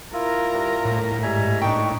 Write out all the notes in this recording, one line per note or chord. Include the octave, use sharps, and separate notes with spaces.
E4 F4 A#4 A#5
G2
A2
G#2 G3 E5 G#5 A#5
D4 D#4 G5 C#6